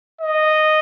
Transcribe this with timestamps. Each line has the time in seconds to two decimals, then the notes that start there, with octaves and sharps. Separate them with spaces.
0.21 D#5